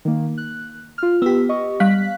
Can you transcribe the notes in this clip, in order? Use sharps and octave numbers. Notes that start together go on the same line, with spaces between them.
D#3 A#3
F#6
F4 F6
B3 G4 E6 B6
D#5 C#6
G3 F5 F#6 B6